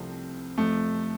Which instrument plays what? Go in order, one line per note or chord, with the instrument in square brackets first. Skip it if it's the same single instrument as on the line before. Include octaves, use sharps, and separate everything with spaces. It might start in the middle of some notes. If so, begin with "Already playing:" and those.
Already playing: [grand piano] C2 C3 F3 A3 [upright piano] C4
[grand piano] F2 C3 F3 [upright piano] A3